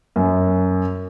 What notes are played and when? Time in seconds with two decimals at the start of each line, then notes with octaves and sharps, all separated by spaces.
0.16 F#2